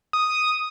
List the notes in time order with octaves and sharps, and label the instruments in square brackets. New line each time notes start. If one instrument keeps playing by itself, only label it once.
[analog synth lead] D#6